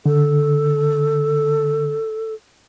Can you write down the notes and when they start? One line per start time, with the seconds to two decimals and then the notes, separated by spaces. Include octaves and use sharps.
0.06 D3 A4